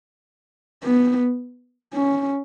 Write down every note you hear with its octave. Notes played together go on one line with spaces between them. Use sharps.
B3
C#4